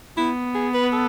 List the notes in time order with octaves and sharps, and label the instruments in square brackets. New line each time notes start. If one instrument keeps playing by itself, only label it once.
[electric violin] B3 [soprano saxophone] E4
[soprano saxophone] G#4
B4
A4